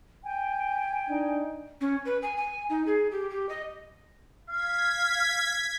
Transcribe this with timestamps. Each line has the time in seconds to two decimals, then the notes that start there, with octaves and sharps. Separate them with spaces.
0.24 G5 G#5
1.09 D4 D#4
1.81 C#4
2.05 B4
2.22 G#5
2.37 G#5
2.69 D#4
2.86 G#4
3.11 G4
3.30 G4
3.49 D#5
4.49 F5 G#6 B6